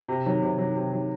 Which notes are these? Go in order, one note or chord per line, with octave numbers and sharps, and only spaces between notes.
C3
D#3 F#3
C3
D#3 F#3
C3
D#3 F#3